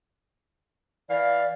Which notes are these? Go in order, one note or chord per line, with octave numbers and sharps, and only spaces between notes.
E3 D5 F5